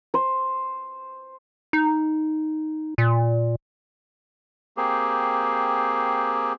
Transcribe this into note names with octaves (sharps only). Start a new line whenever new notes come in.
C5
D#4
A#2
A#3 C4 G4 G#4